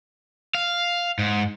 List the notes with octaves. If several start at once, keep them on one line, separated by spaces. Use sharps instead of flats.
F5
G#2